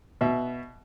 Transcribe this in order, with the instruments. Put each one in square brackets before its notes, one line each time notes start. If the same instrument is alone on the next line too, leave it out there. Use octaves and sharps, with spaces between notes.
[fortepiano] B2 E5